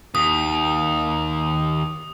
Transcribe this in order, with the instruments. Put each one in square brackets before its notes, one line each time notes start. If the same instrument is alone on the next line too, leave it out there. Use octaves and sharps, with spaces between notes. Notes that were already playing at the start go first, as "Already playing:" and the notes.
[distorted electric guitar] D#2 [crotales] D#6